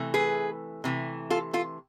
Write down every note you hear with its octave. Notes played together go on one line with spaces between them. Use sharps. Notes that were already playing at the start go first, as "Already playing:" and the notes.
Already playing: C3 E3 A3
G#4 B4
C3 E3 A3
F4 A4
F4 A4